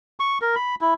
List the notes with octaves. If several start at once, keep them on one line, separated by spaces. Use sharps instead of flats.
C#6
A#4
B5
E4